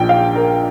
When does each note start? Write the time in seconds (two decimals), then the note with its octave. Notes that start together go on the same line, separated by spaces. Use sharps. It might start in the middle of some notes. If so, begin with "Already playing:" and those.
Already playing: A#1 A#2 F3 G5
0.09 F5
0.35 A#4